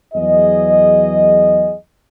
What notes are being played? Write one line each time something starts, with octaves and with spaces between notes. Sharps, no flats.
E2 F#3 G#4 D#5